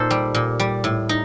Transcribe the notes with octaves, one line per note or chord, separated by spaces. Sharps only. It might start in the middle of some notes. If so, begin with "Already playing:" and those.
Already playing: A#2 D#4 A4 C5
G3
A#2
G3
A2
D#4